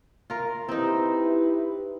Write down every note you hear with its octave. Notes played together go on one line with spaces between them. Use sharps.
F4 A#4
C4 D#4 E4 G4 B4